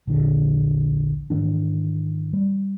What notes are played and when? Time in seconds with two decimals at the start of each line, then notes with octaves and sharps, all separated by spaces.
0.07 A#1 E2 D3
1.30 G#2 D#3 E3 D4
2.33 G3